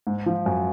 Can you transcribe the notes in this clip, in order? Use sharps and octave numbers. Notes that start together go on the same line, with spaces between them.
G#2
F3
F#2